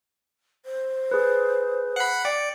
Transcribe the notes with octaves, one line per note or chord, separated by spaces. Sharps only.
C5
G#4 B4
F#5 B5 C7
D5 G5 C#7